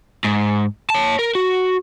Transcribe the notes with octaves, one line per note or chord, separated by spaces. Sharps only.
G#2
C#5 A5
A#4
F#4